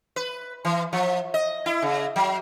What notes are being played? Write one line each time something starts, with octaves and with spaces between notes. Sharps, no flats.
B4
E3
F3
D#5
E4
C#3
F#3